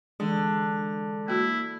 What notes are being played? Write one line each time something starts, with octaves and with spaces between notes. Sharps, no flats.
D3 E3 G#3
A#3 E4 F#4